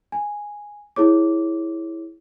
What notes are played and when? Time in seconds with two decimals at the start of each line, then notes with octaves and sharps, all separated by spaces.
0.12 G#5
0.96 E4 G#4 C#5 D6